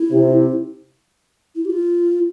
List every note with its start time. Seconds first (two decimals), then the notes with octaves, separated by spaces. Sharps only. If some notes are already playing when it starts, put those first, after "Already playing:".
Already playing: E4
0.11 C3
1.55 E4
1.65 G4
1.70 F4